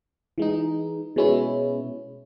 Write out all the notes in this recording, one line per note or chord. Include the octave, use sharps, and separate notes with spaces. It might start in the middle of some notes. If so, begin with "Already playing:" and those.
E3 G#3 D#4
B2 G#3 C#4 E4